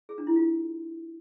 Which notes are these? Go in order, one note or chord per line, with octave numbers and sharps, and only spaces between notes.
G#4
D4
E4
F4